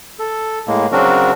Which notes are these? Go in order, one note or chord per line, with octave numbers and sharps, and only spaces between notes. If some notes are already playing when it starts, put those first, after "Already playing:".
A4
A2 G#3 A#3
C#3 F#3 C4 D4 F#4 A#4